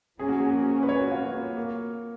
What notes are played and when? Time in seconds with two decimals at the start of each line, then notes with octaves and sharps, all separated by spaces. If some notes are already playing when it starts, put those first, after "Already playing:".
0.19 F3 A#3 C#4 G#4
0.29 F#4
0.39 G#4
0.83 B4
0.89 C#5
1.00 F#4
1.12 F4
1.34 A#3
1.57 A#3